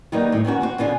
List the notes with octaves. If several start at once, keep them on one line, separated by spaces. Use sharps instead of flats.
D#3 F#3 G3 A#3 B3 D#4
A2
D#3 B3 C#4 F#4
B3 C4 F#4
B2 D3 C#4 F4 G#4